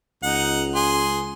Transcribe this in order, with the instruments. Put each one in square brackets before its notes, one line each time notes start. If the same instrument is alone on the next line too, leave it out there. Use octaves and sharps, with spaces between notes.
[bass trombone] C#2 [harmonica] D#4 F#5
[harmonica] G#4 C6